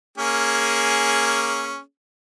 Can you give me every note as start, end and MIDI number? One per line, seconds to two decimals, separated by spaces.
0.18 1.80 58
0.18 1.80 61
0.18 1.80 68